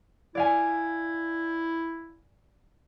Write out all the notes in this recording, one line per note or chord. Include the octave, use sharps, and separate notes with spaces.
E4 D5 F5 G#5